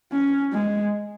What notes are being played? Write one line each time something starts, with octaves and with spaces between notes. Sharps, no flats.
C#4
G#3